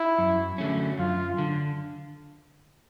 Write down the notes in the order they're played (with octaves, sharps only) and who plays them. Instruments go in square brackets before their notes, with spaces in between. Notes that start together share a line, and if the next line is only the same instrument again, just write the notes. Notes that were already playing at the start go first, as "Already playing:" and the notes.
Already playing: [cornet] E4
[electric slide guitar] F#2
D3 F#3 A3 C#4
[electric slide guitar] F#2 [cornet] F4
[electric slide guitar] D3